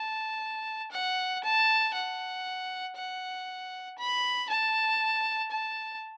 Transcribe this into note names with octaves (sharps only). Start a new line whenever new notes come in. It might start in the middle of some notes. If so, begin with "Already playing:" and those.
Already playing: A5
F#5
A5
F#5
F#5
B5
A5
A5